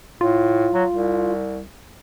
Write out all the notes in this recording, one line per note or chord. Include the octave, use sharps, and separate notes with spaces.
A2 F4
F#3
C2